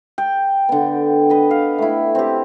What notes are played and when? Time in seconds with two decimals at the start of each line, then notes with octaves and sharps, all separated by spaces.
0.18 G5
0.69 D3 B3
1.30 B4 D#5
1.51 F5
1.79 A3 E4
2.15 C4 G4